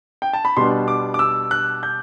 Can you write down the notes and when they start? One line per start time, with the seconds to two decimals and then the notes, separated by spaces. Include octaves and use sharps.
0.22 G5
0.33 A5
0.45 B5
0.57 B2 G3 B3 D4 C6
0.88 D6
1.14 D6
1.19 E6
1.51 F#6
1.83 G6